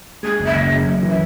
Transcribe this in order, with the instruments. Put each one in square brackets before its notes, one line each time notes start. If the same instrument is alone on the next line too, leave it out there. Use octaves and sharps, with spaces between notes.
[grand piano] G#3 [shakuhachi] G#4
[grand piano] F#1
[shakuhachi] E5
[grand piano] F#1 [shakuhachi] D#5
[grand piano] F#2
F#2
E3
[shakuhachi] E5